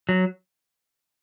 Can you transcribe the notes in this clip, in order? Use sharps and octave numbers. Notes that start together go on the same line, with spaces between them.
F#3